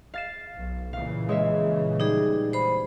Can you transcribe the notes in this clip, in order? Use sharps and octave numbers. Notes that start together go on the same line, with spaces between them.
F5 A6 E7
B1
A#2 C#3 E3 F5
G#3 C#5 E5
G3 D#4 G#4
C5 B5